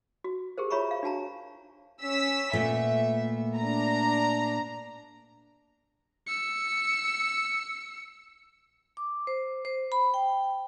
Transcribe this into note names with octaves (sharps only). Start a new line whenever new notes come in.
F#4
G4 G#4 A#4 C5
F4 C#5 E5 A#5 B5 C#6
F5
D4 F#4 A5 A#5
C#4 E6 B6
A#2 A3 B3 E5
D4 A#5
E6 C#7
D6
C5
C5
B5
G5